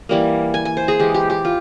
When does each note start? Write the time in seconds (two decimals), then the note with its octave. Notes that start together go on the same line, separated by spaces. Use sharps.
0.09 E3 G3 A#3
0.54 G#5
0.65 G#5
0.77 C5
0.88 G#4
0.99 E3 G#3 G4
1.14 G4
1.30 G4
1.45 F4